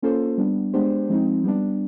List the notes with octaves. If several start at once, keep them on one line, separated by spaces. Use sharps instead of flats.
A#3 C#4 F4 A4 C5
G3 B3 D4
G#3 B3 D4 G4 C5
F3 G#3 C4 D#4
G3 B3 D4